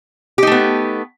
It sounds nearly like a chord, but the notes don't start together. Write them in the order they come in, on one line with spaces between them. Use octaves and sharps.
G4 D#4 A3 B3